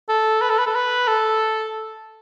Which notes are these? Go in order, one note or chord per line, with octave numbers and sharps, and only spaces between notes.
A4
B4
A4
B4
A4
B4
A4